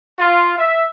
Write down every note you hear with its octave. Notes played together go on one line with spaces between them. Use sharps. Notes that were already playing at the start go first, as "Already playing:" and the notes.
F4
E5